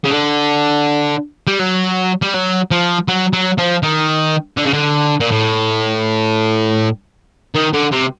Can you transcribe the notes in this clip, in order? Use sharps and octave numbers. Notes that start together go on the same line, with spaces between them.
C#3
D3
G3
F#3
G3
F#3
F3
F#3
F#3
F3
D#3
D3
C#3
D3
A#2
A2
D#3
D3
C3